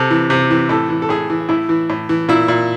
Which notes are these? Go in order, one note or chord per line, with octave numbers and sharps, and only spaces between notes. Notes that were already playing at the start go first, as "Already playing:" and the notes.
Already playing: C3 A4
E3
C3
E3
A2 A4
E3
A4
A2 G#4
E3
A2 E4
E3
A2
E3
A#2 E4
A#2